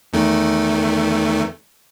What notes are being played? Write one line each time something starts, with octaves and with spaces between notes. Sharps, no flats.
E2 D#3 A3